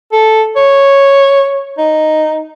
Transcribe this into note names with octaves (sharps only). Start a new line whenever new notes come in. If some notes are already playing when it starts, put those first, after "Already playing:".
A4
C#5
D#4